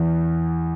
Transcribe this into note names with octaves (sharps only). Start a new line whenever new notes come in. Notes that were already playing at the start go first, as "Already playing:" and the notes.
Already playing: E2